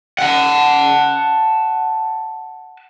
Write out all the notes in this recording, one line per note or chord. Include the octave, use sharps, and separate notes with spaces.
F#5 A5